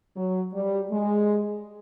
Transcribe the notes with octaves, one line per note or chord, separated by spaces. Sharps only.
F#3
G3
G#3